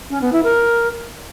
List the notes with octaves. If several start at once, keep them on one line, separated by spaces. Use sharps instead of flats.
C#4
B3
E4
A#4